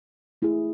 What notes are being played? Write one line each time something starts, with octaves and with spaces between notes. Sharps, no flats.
A3 E4 G#4